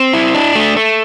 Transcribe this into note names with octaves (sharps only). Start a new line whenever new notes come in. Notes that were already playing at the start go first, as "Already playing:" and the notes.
Already playing: C4
E4
D4
A3
A3